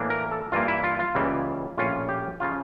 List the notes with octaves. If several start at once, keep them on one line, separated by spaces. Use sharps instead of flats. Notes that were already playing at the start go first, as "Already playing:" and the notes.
Already playing: A2 E3 A#3 D4
A#4
A4
G2 E3 A#3 F4
E4
F4
F4
C#2 C#3 E3 G3 A#3
A#1 A2 G3 C#4 F4
G4
C#3 F3 C#4 F4